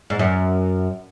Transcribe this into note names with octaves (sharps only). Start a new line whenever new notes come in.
G#2
F#2